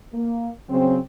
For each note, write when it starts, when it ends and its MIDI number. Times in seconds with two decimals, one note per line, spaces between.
0.14 0.51 58
0.69 0.99 49
0.69 0.99 54
0.69 0.99 60